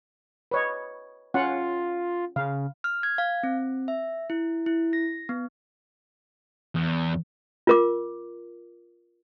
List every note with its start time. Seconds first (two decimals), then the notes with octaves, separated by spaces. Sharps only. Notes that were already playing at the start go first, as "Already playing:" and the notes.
0.51 B4 C#5 D#5
1.34 C#4 F4 F#5
2.36 C#3 F5
2.84 F6
3.03 G#6
3.18 F5
3.43 C4
3.88 E5
4.30 E4
4.66 E4
4.93 A#6
5.29 B3
6.75 E2
7.67 F4 A#4 D6